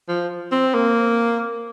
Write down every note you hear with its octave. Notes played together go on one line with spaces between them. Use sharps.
F3
C4
A#3